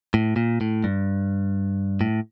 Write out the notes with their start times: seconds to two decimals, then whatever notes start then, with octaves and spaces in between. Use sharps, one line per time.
0.14 A2
0.36 A#2
0.61 A2
0.84 G2
2.01 A2